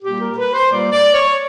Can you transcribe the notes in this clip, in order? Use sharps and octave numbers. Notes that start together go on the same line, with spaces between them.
A#2 G3 G4
A#4
B4
C5
A#2 G3 D5
D5
C#5